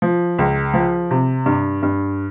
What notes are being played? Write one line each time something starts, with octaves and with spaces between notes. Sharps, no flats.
F3
C#2
F3
C3
G2
G2